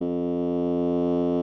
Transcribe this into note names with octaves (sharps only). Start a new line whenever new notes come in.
F2